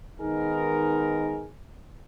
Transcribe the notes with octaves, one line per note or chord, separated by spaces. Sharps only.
D#3 G#3 B3 D#4 G#4 A#4